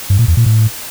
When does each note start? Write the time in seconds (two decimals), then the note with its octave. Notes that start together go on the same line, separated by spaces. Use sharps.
0.10 G2
0.19 A#2
0.28 E2
0.37 A#2
0.46 A2